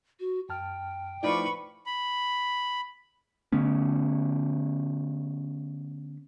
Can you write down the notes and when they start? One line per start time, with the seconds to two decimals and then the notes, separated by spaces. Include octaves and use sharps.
0.20 F#4
0.49 F#2 G5 A5 F6
1.23 F3 A3 D#4 E4 B4 D5 C#6
1.86 B5
3.52 D3 A3 B3 C#4